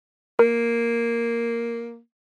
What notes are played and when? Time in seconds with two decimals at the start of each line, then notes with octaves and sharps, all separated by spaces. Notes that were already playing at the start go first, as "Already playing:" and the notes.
0.39 A#3 A#4